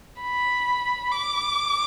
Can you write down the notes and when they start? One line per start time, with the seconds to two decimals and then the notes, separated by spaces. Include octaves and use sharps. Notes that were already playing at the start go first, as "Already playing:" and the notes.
0.21 B5
1.11 D6